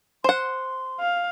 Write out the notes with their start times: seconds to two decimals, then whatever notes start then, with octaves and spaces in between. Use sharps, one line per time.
0.24 C5 F#5 C6
1.00 F5